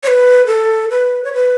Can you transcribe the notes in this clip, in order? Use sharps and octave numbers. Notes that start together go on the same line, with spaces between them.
C#5
B4
A4
B4
C#5
B4